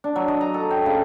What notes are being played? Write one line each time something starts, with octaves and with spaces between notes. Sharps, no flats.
D4
F#3
D#5
A#5
A4
G5
C#3